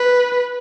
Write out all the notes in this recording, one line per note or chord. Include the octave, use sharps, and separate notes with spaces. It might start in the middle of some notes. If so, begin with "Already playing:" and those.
Already playing: B4